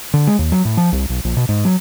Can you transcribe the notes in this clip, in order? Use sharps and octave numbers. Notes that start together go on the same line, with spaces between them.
D3
G#3
D#2
F#3
A2
F3
C2
B1
A#1
B2
G#2
F#3